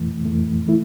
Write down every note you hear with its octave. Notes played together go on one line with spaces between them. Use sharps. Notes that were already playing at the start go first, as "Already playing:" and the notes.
Already playing: F2 E3 A3
F2 E3 A3
E3 A3 E4